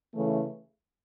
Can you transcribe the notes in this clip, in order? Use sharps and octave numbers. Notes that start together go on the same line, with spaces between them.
C#3 E3 A3